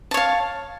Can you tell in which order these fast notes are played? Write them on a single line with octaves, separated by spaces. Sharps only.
A5 C#5 F5